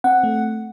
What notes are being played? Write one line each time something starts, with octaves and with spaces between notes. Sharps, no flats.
C4 F#5
A3